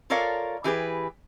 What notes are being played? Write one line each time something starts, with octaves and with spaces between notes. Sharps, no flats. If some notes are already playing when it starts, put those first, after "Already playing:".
F4 A4 A#4 C#5 D5 F5
E3 G4 G#4 B4